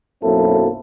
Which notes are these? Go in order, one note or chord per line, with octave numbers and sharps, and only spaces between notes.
B1 F#2 A#3 C4 E4 A4